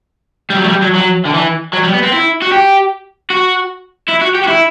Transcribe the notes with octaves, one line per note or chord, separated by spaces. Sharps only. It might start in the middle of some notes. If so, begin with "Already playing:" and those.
G3
F#3
A3
G3
F#3
F#3
D3
E3
F#3
G3
B3
C4
E4
F#4
G4
F#4
E4
F#4
G4
F#4
E4